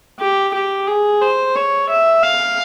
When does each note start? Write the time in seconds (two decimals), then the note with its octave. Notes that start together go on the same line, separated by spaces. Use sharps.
0.20 G4
0.54 G4
0.88 G#4
1.22 C5
1.56 C#5
1.90 E5
2.23 F5